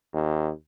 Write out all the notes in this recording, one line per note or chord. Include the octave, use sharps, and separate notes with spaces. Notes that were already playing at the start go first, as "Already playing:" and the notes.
D#2